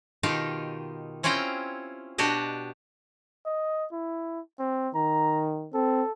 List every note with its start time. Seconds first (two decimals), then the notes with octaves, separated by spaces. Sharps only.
0.23 B2 D#3 D#4 F4 G4
1.23 C4 C#4 E4 F4 G5 A#5
2.18 B2 D4 F#4 G4 D#5
3.46 D#5
3.92 E4
4.59 C4
4.95 D#3 A#5
5.74 C4 A4